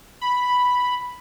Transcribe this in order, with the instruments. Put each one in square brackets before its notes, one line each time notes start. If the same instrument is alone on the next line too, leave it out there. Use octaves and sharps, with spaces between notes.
[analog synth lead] B5